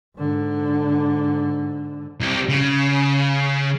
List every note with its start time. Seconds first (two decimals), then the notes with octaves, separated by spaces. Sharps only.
0.17 G#2 D3
2.20 C2 G4
2.49 C#3